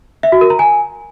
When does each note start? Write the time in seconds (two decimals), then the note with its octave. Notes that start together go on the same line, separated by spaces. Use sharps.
0.23 E5
0.32 F#4
0.41 A#4
0.50 A#5
0.59 G#5